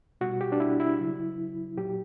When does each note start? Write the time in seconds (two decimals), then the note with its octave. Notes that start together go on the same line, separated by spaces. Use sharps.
0.21 B2 G3 F#4
0.41 G4
0.52 D4
0.60 E4
0.80 E4
0.99 C#3 F#3
1.77 A#2 F#3 G4